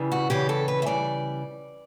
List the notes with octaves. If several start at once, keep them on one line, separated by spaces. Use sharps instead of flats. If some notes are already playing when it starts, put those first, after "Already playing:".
Already playing: C#3 E3 G3
F#4
C#3 E3 G3 G4
A4
B4
E5
C#3 E3 G3 D5